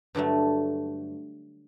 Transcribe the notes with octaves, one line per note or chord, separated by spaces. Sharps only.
G2 D3 F#3 A3